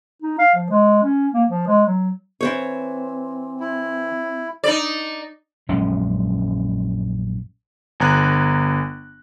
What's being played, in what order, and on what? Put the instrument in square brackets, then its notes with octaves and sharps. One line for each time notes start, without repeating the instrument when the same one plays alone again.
[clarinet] D#4
F5
F3
G#3
C#4
A#3
F3
G#3
F#3
[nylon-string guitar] E3 C5 C#5 [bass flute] C4
[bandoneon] E4
[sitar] D#4 D5
[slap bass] A#1 F#2 G#3 C#4
[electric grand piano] G1 G#5 A#5 F#6